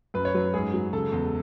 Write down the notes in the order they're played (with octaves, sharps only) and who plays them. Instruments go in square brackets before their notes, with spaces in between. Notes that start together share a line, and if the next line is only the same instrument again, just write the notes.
[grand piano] F#2 B4
C#5
F#3 B4
G#2 G#4
F#3
C#3 A4
E2